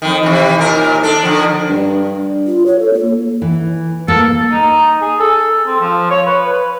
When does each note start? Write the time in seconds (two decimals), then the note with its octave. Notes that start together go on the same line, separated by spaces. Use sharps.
0.02 F2 D#3
0.23 C3 E3
0.58 D#2 A#2 A#4
1.03 D4 A4
1.24 D3 F3
1.69 G2
2.47 F4
2.66 C#5
2.79 A4
2.94 A#3
3.42 E3
4.08 A#3 A4
4.51 D#4
5.01 G#4
5.20 A4
5.67 C4
5.80 F3
6.10 C#5
6.26 B4
6.53 B4